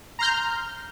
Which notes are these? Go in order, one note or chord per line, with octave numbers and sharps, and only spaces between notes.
A#5 C6 F6 G6